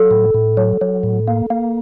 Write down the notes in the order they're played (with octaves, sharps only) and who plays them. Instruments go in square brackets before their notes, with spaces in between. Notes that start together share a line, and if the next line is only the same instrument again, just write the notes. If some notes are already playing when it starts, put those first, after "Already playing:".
Already playing: [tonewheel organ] F#3 [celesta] A4
[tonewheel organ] A2
A2
F#3
F#3
A2
A#3
A#3